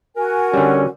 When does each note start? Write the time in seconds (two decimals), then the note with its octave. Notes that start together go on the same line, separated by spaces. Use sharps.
0.16 F#4 A#4 G#5
0.54 D3 G3 C#4